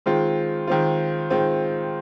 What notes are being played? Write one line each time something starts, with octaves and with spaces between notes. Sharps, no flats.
D#3 G#3 C4 F4
D#3 G#3 C4 F4
D#3 G#3 C4 F4